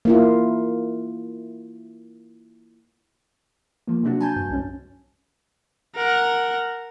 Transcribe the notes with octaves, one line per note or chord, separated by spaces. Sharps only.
A#3 E4 F4
F3 A#3
C3 F#3 D4 F#4
G#5 A5 G6
G2
B1 G#2 C#4
A#4 F#5